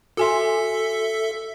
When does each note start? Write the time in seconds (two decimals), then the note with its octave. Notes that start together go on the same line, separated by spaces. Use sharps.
0.17 F#4 A4 E5 G#5 C6